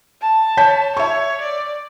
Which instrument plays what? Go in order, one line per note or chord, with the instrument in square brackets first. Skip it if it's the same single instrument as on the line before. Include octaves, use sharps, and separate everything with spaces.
[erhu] A5
[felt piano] C#5 G6 B6
[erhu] C#5 [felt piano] E5 C#6
[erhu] D5